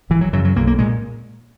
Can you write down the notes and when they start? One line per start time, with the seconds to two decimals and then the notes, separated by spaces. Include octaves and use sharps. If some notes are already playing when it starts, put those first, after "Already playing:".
0.10 G#1 E3
0.21 F#3
0.33 F#2 C#3 F#3
0.45 F#3
0.56 B1 A#3
0.67 A#3
0.79 A#2 G#3